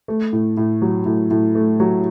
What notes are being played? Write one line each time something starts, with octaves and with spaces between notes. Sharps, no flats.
A3
A2
A2
F#3
A2
A2
A3
F#3